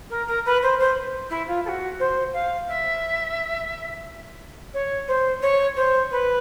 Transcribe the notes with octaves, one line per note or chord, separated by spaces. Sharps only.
A#4
A#4
B4
C5
C5
E4
F4
A4
F#4
C5
F5
E5
C#5
C5
C#5
C5
B4